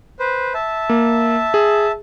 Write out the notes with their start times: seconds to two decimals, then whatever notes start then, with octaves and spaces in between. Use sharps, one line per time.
0.19 B4 C5
0.54 E5 A5
0.89 A#3
1.54 G#4